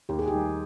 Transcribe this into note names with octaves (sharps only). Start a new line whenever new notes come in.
D#2 G4
G#4
G4
D#3 G3